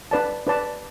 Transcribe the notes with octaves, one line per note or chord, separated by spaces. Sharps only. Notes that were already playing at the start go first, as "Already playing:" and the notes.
D4 B4 D5 A5
D4 B4 D5 A5